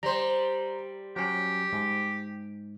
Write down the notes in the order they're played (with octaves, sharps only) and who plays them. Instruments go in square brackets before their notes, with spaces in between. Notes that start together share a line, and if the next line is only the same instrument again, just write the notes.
[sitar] G3 C5 [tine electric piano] A#5
[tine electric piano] F#3 C#4 [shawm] G4
[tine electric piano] G#2